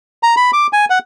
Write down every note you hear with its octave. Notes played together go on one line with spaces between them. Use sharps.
A#5
B5
D6
G#5
F#5